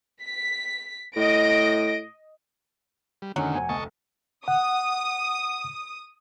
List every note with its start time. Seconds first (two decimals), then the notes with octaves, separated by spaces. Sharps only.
0.23 B6
1.16 A2 D#5 A#6 D7
3.22 G3
3.36 F1 D3 D#3 F#3 C#4 C#7 F#7
3.54 F1 F2 C5 G#5
3.69 F1 D2 D#5 A5 C#6
4.48 F#5 D#6